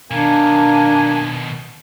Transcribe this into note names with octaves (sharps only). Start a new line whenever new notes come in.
B2 D#3 A#3 D4 G#5